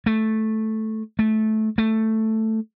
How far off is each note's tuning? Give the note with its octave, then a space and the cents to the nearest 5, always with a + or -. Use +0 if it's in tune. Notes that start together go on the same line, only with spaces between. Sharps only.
A3 -5
A3 -15
A3 +5